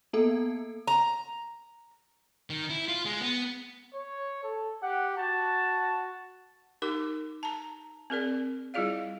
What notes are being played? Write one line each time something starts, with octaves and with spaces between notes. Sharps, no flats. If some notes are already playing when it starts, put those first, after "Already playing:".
A#3 B3 A4
A#5
D#3
E4
F4
G#3
B3
C#5
A4
G4 F#5
F#4 A5
D#4 G4 A#4 D6
A5 A#5
C4 G#4 A#4 D5
G3 E4 F4 G#4 D5 F5